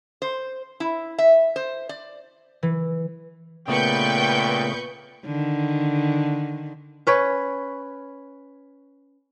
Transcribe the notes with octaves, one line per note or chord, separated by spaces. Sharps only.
C5
E4
E5
C5
D5
E3
A#2 C#3 A3 B3 B4 G5 C#6 G6
D3 D#3
C#4 B4 C#5